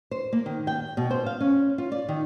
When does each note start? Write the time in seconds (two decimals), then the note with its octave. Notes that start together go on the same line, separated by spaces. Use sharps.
0.11 C5
0.33 A#3
0.46 D#3
0.67 G5
0.97 B2
1.11 C5
1.26 F5
1.41 C#4
1.78 F4
1.92 D5
2.08 D#3